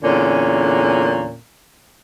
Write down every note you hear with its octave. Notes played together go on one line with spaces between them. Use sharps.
E2 A#2 D3 C#4